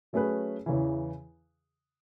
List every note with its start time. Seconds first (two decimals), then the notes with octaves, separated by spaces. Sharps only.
0.13 F#3 A3 C#4 G#4 B4
0.66 E2 C#3 E3